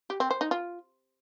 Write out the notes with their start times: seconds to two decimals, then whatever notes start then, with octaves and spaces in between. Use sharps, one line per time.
0.10 G4
0.20 C4
0.31 C5
0.41 D#4
0.51 F4